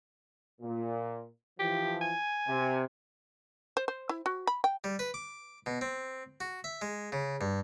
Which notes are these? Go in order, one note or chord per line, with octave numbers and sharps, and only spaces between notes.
A#2
E3 F3 G4
G#5
C3
C5
C5
E4
F#4
B5
G5
G3
B4
D6
B2
C4
F#4
E5
G#3
C#3
G2